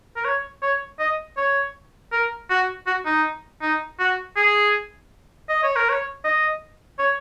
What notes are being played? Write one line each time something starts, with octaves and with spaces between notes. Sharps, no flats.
A#4
C#5
C#5
D#5
C#5
A#4
F#4
F#4
D#4
D#4
F#4
G#4
D#5
C#5
A#4
C#5
D#5
C#5